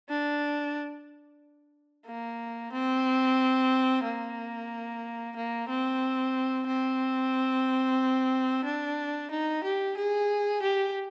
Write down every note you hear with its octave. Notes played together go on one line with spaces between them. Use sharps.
D4
A#3
C4
A#3
A#3
C4
C4
D4
D#4
G4
G#4
G4